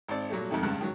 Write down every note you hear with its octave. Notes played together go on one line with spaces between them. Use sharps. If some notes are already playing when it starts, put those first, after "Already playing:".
G#1 C4 D5
A#2 F#3 G3 A3
F2 G#2 C3 D#3 A3
C#2 G2 C#3 A5 F#6
G#2 D#3 F#3